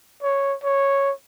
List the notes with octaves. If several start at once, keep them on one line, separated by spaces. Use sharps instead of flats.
C#5
C#5